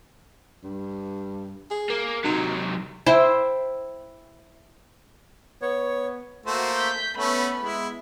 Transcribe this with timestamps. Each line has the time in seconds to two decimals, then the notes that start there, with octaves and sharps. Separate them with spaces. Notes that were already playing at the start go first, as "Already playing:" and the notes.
0.63 G2
1.71 G#4
1.90 A#3
2.24 C3 F#3 D#4
3.06 E4 C5 E5 G5
5.62 B3 C#5
6.46 A3 A#3 F#4 C5
6.76 G6 B6
7.17 A3 B3 C#4 B5
7.60 G#3 E4